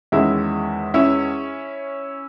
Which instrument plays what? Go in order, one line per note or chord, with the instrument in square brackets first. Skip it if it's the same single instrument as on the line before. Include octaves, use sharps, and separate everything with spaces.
[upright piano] E2 D#3 G#3 C#4 E4
C#4 E4